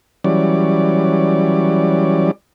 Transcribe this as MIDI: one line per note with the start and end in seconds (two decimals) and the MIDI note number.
0.24 2.31 52
0.24 2.31 54
0.24 2.31 55
0.24 2.31 61
0.24 2.31 74